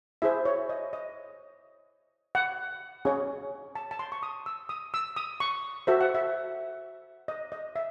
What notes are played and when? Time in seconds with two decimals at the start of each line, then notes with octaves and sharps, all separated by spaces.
0.22 E4 G#4 C5 E5
0.45 C#5
0.69 D#5
0.93 D#5
2.35 F#5
3.05 C#4 G#4 C#5
3.75 A5
3.91 A5
3.99 C6
4.12 C#6
4.23 D#6
4.46 E6
4.69 D#6
4.94 E6
5.16 D#6
5.40 C#6
5.87 F#4 A4 C5 E5
6.01 F#5
6.15 E5
7.28 D#5
7.52 D#5
7.76 E5